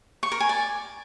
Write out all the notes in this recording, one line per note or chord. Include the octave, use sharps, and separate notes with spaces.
C#6
A#4
G#5
D5